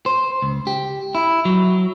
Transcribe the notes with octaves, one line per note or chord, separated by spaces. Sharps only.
C5
C#2
G4
E4
F#3